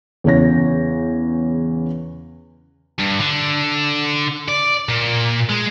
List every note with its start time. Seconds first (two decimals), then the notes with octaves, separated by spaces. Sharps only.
0.24 E2 C#3 C#5 A#6
2.99 G2
3.19 D3
4.48 D5
4.89 A#2
5.50 G#3